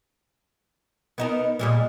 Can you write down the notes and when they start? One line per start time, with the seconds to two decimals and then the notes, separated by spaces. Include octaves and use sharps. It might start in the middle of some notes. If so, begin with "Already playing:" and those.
1.18 B3 D#4 A#4
1.59 A#2 G3 G#3